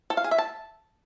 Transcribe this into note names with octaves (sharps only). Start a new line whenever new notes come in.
A4
F5
G#4
E5
A5